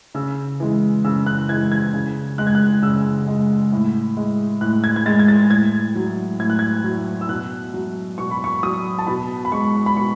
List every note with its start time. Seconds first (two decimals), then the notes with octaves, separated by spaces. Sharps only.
0.15 C#3 E6
0.60 E3 G#3
1.04 C#3 E6
1.27 F#6
1.49 E3 G#3 G#6
1.72 G#6
1.93 C#3
2.38 G#3 F#6
2.47 G#6
2.55 F#6
2.83 C#3 E6
3.27 G#3
3.72 A2
4.17 G#3
4.61 A2 F#6
4.84 G#6
4.96 G#6
5.06 G#3 A6
5.19 G#6
5.28 A6
5.50 A2 G#6
5.95 F#3
6.40 A2 G#6
6.50 F#6
6.59 G#6
6.84 F#3
7.21 E6
7.29 B2 F#6
7.74 F#3
8.18 B2 C#6
8.31 B5
8.44 C#6
8.63 F#3 D#6
8.99 A5
9.07 B2 B5
9.45 B5
9.52 G#3 C#6
9.86 B5
9.97 B2 C#6